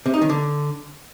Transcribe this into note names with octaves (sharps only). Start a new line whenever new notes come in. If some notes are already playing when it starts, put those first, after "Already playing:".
C3
D#4
D#3
D3